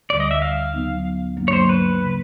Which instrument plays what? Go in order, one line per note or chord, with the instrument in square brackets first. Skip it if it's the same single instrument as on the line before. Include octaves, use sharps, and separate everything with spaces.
[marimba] D2 D3 G3 [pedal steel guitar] D5
[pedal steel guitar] D#5
E5
F5
[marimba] C#3 F#3 B3 D#4
G2 D3 F#3 A#3 D4
[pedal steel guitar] C#5
C5
B4
[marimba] C#3 F3 A#3